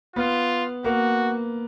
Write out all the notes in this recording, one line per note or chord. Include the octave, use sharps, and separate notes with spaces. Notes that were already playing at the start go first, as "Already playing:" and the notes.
B3 F4
A#3 F#4